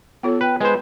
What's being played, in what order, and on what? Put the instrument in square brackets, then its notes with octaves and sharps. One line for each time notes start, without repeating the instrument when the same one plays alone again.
[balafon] B3 F4 C#5 [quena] A4
[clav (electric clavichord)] B4 [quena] G5
[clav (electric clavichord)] G#3 C5 [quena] B4